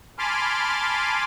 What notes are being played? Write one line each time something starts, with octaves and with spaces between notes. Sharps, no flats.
G#5 A5 B5 C6 D6 F6